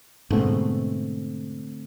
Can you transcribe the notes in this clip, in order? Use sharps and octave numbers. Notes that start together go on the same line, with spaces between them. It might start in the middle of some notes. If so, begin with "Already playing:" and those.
G#2 B2 D3 A3 C4